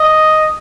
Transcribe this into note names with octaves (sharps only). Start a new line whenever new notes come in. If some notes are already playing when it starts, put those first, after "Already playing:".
Already playing: D#5